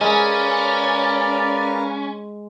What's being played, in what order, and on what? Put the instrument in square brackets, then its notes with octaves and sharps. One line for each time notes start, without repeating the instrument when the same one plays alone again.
[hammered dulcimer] G#3 [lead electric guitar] C#4 [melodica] A#4 B4 F5 [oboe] D5